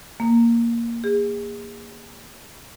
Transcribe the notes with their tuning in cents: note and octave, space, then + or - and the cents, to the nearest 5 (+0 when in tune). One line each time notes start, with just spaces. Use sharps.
A#3 +0
G#4 -35